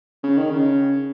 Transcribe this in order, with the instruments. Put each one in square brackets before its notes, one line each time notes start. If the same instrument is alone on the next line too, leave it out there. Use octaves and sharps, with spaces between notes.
[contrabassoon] C#3
D#3
C#3